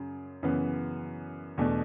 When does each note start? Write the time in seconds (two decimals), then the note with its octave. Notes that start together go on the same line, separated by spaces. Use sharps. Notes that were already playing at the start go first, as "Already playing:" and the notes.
Already playing: F#2 C#3
0.43 F#2 C#3 E3 B3
1.58 E2 B2 A3 D4